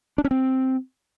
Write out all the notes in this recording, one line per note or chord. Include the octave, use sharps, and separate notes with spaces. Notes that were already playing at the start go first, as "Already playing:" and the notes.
D4
C#4
C4